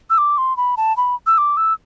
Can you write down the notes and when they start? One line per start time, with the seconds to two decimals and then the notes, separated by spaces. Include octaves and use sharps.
0.10 E6
0.18 D6
0.38 C6
0.57 B5
0.77 A5
0.97 B5
1.27 E6
1.38 D6
1.57 E6